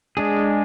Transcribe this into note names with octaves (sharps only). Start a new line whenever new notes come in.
G#3 D4 G#4